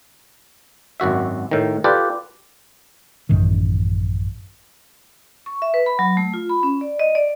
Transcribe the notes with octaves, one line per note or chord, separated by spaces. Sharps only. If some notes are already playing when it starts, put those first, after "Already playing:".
G#1 F#2 F#4 E5
A2 D#3
F4 G4 A4 B4 D5
A1 F#2 A2 D#3
C#6
E5
B4
B5
F#3
A3
F4
B5
C#4
D5
D#5
D5